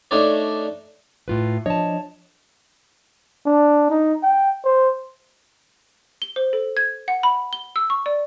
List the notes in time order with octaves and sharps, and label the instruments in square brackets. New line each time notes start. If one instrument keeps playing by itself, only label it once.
[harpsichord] A3 D4 D#4 C#5 D5
[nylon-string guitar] A2 F4 B4
[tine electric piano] F3 D4 D#5 [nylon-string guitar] C#5 A5
[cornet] D4
D#4
G5
C5
[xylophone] G7
C5
A4
G#6
F#5
B5
G7
E6
C#6
D5